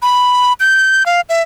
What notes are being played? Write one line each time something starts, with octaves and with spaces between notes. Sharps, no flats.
B5
G6
F5
E5